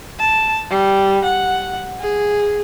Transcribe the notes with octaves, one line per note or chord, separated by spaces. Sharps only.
A5
G3
F#5
G#4